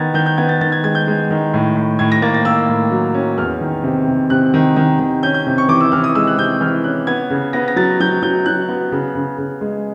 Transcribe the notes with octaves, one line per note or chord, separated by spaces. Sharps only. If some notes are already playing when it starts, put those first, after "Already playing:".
Already playing: D#3 B3 G#6 A6
D#3 G6
G6
B3 G#6
A6
D#3 A6
G#6
G#3 G#6
G6
G#3
D#3
A2
A2
A2 G#6
A#6
A#3 A6
A6
A#3 E6
A2
F#3
C#4
E2 F6
D#3
C3
C3
C3 F#6
D#3
D#3
D#3
C#4 G6
G6
C3
C#6
E3 D6
E6
E3 F6
D#6
G#3 E6
F#6
C3 G6
E3 F6
C#4 F#6
B3 G#6
C#3
B3 A#6
A#6
F#3 A6
F#3 G6
F#3 G6
F#3 F#6
B3
C#3
C#3
C#3
G#3